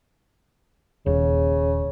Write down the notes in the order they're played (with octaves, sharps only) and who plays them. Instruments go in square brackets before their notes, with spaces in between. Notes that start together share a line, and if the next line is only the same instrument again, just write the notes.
[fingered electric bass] D#1 [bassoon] C#3